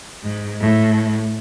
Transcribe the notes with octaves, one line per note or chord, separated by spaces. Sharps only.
G#2
A2